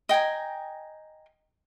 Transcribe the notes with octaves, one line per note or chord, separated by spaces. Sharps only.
D#5 G5 G#5 A#5